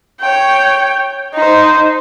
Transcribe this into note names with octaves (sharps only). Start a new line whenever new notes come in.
C#5 G5
D#4 C5